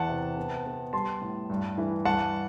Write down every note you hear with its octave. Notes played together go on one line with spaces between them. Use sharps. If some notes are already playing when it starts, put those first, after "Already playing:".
Already playing: E2 E3 F#5 A5
C3
B3
B3
G3 A5 C6
A2
G2
E3
G2 F#5 A5